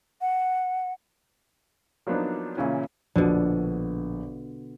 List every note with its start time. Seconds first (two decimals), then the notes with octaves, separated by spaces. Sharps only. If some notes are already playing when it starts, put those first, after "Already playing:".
0.21 F#5
2.07 F3 F#3 A#3 B3 D4 D#4
2.57 A#2 C#3 E3 C#4 E4
3.16 A#1 B2 D3